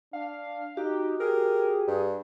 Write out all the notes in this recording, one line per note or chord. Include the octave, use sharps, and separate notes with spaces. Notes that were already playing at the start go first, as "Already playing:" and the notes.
D4 F5
D#4 F#4 G4
G4 G#4 A#4
G2